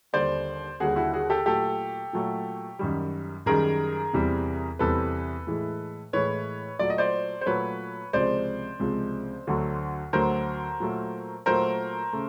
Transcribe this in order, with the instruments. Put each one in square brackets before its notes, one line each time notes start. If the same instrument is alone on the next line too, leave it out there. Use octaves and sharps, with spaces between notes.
[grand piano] D#2 D3 G3 C5 D5
D#2 D3 G3 F#4 G#4
E4 F#4
F#4 G#4
G4 A4
A#2 F#3 A3 G4 A4
A#2 F#3 A3
F#2 D#3 G3
F#2 D#3 G3 G#4 A#4
E2 C3 E3 G3
E2 C3 E3 G3 A4 B4
A2 E3 G#3
A2 E3 G#3 B4 C#5
A#2 F#3 A3 D5
D#5
C5 D5
C5
A#2 F#3 A3 B4 C#5
C#2 C3 F3 G#3 C5 D5
C#2 C3 F3 G#3
D2 D3 F#3 A3
D2 D3 F#3 A3 A#4 C5
A#2 F#3 A3
A#2 F#3 A3 A#4 C5
C#3 A3